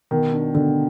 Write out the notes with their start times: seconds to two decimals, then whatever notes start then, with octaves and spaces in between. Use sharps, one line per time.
0.11 B2 D#3
0.33 D4
0.55 B2 D3